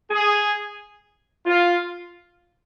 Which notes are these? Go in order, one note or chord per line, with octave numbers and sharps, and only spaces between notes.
G#4
F4